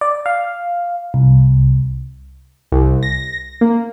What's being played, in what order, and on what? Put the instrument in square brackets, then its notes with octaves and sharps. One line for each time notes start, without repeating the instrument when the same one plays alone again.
[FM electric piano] D5
F5
C2
[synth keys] C2
A#6
A#3